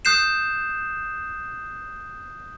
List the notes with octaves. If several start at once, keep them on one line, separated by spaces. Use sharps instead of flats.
D#6 F#6 G6 C7 E7